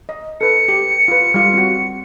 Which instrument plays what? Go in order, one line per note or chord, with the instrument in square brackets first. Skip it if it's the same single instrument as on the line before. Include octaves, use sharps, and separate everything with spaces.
[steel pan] D#5
[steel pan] A4 B4 [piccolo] C#7
[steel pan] G4
F4 B4
G3 F4
C4 F#4